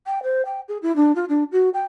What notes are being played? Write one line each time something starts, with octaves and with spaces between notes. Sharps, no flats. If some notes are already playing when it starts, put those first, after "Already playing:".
G5
C5
G5
G#4
E4
D4
F4
D4
F#4
G5